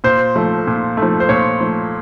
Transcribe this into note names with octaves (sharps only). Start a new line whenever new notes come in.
A#2 C5
F3 A3
A#2
A3
F3
C5
A#2 C#5
F3 A3